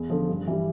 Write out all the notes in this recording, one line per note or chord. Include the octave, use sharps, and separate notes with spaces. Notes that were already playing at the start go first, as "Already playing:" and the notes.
Already playing: E2
D3 F3
G2
E3 G3